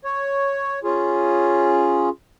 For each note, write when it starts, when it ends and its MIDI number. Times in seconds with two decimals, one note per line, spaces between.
0.04 0.79 73
0.84 2.09 61
0.84 2.09 65
0.84 2.09 68